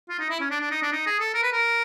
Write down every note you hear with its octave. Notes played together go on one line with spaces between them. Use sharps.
F4
D#4
E4
C#4
D4
D4
D#4
D4
D#4
G#4
A4
A#4
B4
A#4